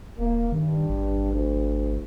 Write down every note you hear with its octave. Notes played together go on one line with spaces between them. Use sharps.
D#1 A#3
G2 D#3
G#1
D2